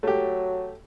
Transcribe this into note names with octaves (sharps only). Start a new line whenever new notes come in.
F#3 A3 G4